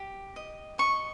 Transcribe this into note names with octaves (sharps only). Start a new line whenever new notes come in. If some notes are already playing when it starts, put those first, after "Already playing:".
Already playing: G4
D#5
D#5 C#6